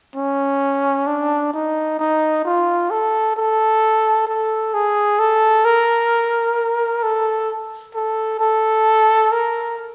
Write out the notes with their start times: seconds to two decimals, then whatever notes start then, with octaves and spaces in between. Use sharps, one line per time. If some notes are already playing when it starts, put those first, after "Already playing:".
0.15 C#4
1.07 D4
1.53 D#4
1.99 D#4
2.45 F4
2.90 A4
3.36 A4
4.27 A4
4.74 G#4
5.19 A4
5.65 A#4
7.03 A4
7.95 A4
8.40 A4
9.32 A#4